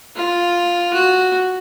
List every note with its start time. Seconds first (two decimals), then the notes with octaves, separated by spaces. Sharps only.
0.16 F4
0.93 F#4